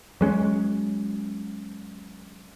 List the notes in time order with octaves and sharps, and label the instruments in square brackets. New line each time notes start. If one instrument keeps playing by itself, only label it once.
[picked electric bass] F#3 G#3 C#4